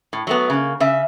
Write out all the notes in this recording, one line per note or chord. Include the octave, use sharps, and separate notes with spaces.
A2
F#3 A3 B3
C#3 A#3
C#3 E5